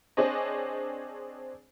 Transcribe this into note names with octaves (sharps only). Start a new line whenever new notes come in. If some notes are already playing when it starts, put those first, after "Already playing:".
C4 D4 G#4 C5 C#5 D#5